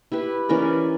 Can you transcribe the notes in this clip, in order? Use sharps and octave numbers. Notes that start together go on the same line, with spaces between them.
E4 G4 B4
E3 C#4 A#4 D5